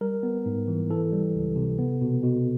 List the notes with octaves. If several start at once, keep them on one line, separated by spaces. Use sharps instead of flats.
G3 A#4
B3
G#2
E3
E3 A4
G3
C#2
C3
B3
B2
B2